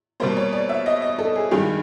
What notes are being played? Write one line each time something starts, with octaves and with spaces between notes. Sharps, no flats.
B2 G3 A#3 C5
C#5
D5
E5
D#5
D#5
A4
G#4
G2 D#3 G#3 G4